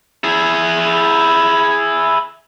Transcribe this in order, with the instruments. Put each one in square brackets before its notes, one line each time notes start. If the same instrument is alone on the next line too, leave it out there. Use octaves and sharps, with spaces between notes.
[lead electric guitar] E4 G#4